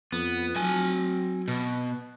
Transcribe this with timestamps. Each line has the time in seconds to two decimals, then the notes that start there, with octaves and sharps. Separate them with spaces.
0.12 F2 B3
0.56 F#3 C4 G#5
1.48 B2